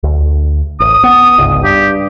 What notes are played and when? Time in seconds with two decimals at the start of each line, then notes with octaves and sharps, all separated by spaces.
0.03 D2
0.80 A1 D#6
1.04 B3
1.38 G1 C#2 G#2
1.64 G2 G4